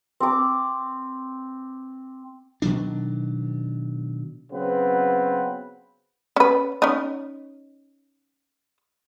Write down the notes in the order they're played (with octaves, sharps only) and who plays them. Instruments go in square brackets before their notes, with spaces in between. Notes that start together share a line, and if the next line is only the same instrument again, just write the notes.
[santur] C4 D6
[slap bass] B2 D#3 F#3 D4
[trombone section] C#3 F#3 B3 C4 B4
[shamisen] C#4 B4
C#4 D#4